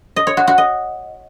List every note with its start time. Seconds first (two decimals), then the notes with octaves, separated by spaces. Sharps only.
0.16 D#5
0.27 C#5
0.37 F#4
0.47 F#4
0.58 D#5